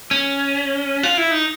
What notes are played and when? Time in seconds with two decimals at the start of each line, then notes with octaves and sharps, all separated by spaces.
0.11 C#4
1.03 F4
1.17 E4
1.31 D#4